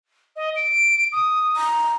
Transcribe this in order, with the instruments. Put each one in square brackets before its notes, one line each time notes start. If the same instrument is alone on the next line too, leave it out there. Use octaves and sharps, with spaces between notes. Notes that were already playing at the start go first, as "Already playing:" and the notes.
[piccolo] D#5
D7
D#6
[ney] A#5